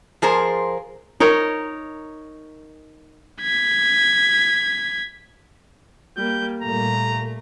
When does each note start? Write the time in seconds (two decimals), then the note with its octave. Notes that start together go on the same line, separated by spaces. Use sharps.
0.22 F3 G#4 A#4 C5
1.20 D#4 A#4 C#5
3.42 G#6 B6
6.17 G3 A#3 G6
6.62 A#2 G3 A3 A#3 A#5